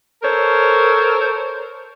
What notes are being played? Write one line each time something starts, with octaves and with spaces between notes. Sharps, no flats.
A4 A#4 C5 C#5